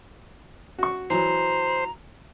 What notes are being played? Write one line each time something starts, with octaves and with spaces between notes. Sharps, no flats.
F#4 C#6
E3 F#3 C5 A#5